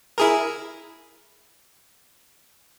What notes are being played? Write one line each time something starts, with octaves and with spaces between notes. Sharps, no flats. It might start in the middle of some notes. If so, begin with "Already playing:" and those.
E4 G#4 A#4